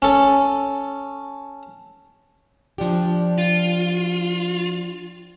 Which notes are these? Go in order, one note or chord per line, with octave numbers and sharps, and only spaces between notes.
C#4 A4
F3 D4 G4
F4